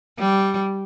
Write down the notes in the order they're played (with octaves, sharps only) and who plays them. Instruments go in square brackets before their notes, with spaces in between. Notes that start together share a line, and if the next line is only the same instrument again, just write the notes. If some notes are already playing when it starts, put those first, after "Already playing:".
[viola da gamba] G3